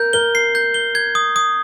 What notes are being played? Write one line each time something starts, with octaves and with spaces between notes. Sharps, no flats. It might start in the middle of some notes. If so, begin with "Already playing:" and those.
Already playing: A#4 G6
A#4 G7
C7
G6
G7
G#6
D#6
D#6